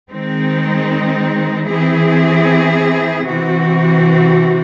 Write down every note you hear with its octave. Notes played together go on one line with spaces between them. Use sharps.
D#3 G#3 C4 D#4
E3 C4 E4 G#4
C3 E3 C4 F#4